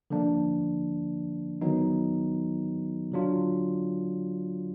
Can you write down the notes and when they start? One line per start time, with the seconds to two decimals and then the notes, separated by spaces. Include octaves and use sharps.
0.10 D3 F3 A#3 D4
1.61 D#3 F#3 B3 D#4
3.12 D3 F#3 D4 F4